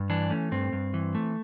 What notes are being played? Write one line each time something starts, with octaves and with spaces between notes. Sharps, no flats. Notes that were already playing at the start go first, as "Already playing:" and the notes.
Already playing: G2
E3 D4
A3 C#4
G2 C4
G2
E3
A3